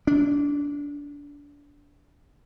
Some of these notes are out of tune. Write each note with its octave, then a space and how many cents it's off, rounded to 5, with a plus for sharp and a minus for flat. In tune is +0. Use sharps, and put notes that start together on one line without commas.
D4 -25